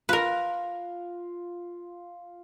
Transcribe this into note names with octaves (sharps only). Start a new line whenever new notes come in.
F4 A#4 B4